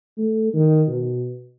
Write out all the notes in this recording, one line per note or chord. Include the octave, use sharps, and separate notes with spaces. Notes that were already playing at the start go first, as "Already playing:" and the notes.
A3
D#3
B2